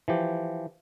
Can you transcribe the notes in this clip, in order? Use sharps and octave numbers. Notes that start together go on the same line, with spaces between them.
E3 F3 G4